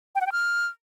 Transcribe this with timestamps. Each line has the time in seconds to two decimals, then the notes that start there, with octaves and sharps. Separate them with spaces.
0.15 G5
0.21 F#5
0.26 G5
0.32 F6